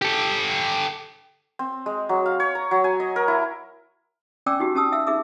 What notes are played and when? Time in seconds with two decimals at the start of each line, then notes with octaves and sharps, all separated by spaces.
0.02 G4 A4
1.59 C4
1.86 G#3
2.09 F#3
2.26 F5
2.40 C#5
2.55 A#5
2.71 F#3
2.84 G#5
3.00 D#5
3.16 A#4
3.28 E4
4.46 C#4 D5 G5 G#5 D6 E6
4.60 D#4 F#4 G4
4.75 C#4 G4 A5 D#6 E6
4.92 E5 F5 E6
5.07 D#4 G#4 E5 D6 E6